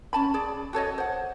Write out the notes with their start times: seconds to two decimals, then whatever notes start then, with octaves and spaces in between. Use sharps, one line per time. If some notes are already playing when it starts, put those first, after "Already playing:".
0.13 C#4 A5 B5
0.34 G#4 D5
0.73 F#4 A4 C#5 D#5
0.98 C5 F#5